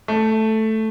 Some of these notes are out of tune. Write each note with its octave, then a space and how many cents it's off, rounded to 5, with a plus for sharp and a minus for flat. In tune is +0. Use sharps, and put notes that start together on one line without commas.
A3 +0